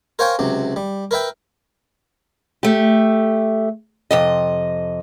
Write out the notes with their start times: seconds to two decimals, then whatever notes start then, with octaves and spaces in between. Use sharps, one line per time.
0.19 A#4 C5 C#5 F5 G5 G#5
0.39 C#2 C3 F#3
0.76 G3
1.11 A#4 B4 E5 G5
2.63 A3 G4
4.11 F2 C3 D#5